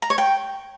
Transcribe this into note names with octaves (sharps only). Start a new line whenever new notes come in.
A#5
C#5
G5